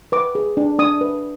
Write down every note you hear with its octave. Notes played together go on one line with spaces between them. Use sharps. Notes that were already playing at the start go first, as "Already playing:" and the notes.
B4 D6
G#4
D4
D4 D#6
B4